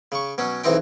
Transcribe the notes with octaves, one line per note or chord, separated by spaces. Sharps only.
C#3 C#6
B2 F#3 C#4
B1 E2 E3 C4 D#4 G5